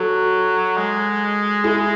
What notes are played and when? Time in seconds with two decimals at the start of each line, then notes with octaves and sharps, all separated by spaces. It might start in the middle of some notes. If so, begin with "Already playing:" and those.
Already playing: F#3 F#4 A4
0.77 G#3
1.64 E4 G#4